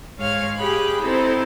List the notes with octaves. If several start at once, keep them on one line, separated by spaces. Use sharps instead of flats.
G#2 G#3 C#5 F5 F6 G#6
G4 G#4 B5 F#6
C4 D#4 E4 A4 C5